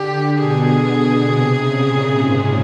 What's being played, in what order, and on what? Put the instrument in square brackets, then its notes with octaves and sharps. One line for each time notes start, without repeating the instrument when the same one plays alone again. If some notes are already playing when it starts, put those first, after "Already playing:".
Already playing: [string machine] D3 [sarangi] G4
[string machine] B2 [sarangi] G#4
[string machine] C3
C#3
A#2
G#2